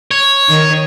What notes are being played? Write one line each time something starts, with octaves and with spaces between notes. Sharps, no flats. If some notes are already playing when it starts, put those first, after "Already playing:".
C#5
D#3